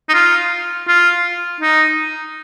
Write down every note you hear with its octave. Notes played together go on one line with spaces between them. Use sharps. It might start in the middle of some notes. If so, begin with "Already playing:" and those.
D#4
F4
F4
D#4